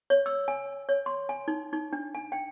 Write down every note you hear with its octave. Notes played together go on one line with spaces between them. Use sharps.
C#5
E6
G#5
C#5
C6
G#5
D#4
D#4
D4
G#5
G5